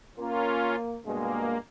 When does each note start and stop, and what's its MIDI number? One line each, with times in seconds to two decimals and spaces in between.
0.18 0.96 58
0.18 0.76 61
0.18 0.76 65
1.05 1.56 43
1.05 1.56 47
1.05 1.56 56
1.05 1.58 58